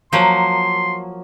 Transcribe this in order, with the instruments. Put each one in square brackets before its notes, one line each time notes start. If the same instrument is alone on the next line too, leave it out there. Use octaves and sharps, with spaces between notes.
[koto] F3 F#3 A#3 [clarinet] C6